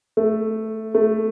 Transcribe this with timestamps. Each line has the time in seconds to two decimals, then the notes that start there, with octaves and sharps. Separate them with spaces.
0.17 A3
0.95 A3